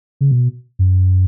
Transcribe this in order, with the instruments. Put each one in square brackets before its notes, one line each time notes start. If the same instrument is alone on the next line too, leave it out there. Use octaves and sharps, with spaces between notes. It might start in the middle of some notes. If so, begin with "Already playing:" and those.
[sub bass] C#3
B2
F#2